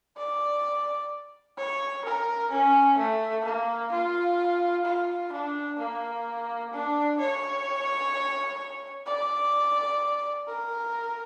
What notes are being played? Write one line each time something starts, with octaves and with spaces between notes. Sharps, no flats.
D5
C#5
A#4
C#4
A3
A#3
F4
F4
D4
A#3
D4
C#5
D5
A#4